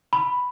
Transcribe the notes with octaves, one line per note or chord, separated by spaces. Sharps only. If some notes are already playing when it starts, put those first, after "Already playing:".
B5